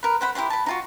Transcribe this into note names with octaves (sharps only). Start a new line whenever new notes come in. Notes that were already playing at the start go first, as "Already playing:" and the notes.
A#4 B4
C5 F#5 B5
E4 G4 C5 C6
A5 B5
D#4 F4 F#4